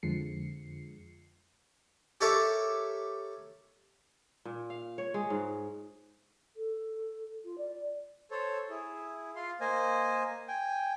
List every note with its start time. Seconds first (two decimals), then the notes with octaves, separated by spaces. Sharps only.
0.03 F2 D3 F3 G#3 C7 C#7
2.21 G4 A4 A#4 C#5 E5
4.45 A#2
4.70 F5
4.98 C#5
5.14 G#3
5.30 G#2
6.56 A4
7.44 F4
7.58 D5
8.31 A4 C5 C#5
8.69 E4 G#4
9.36 F4 F5 C6
9.61 A#3 C5 D#5 G#5
10.48 G5 G#5